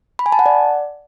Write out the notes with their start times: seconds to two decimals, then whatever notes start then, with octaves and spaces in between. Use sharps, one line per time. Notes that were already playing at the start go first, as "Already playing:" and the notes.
0.19 B5
0.26 G#5
0.32 A5
0.39 F#5
0.46 D5